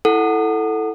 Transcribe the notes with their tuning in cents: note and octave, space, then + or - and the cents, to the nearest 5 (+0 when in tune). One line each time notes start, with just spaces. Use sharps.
E4 +0 A4 +0 F#5 +0